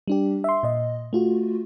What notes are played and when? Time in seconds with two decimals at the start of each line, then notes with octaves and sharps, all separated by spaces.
0.08 G3 D4 G4
0.44 E5 C6
0.63 A#2 D#5
1.13 A3 F4 F#4